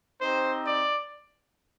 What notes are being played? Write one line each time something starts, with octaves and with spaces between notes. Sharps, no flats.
C4 D#4 G4 C5
D5